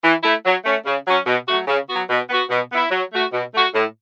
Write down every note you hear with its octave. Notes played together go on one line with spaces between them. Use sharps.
E3
A3 E4
F#3
A3 C#4
C#3
F#3 C#4
B2
F#3 A3 F#4
C#3
F#3 B3 F#4
B2
B3 F#4
B2
B3 E4
F#3
A3 F#4
B2
A3 F#4
A2